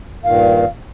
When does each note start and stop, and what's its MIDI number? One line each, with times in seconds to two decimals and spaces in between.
0.24 0.65 43
0.24 0.65 46
0.24 0.65 51
0.24 0.68 77